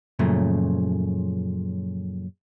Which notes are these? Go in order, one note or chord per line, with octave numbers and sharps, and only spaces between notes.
F#2 A#2 C#3 F3 A3